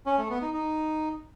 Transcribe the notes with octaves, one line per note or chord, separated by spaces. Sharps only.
C#4
A3
B3
D#4
D#4